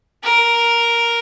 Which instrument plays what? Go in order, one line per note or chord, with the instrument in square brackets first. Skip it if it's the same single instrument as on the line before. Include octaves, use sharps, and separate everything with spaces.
[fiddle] A#4